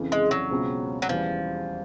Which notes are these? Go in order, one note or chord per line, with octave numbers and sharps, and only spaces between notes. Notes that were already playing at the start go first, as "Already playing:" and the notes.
Already playing: F2 C#3 E3
G#3
F#3
C#2 B2 G#3 C4 F4
F#3
E2 C#3 E3 F3 G3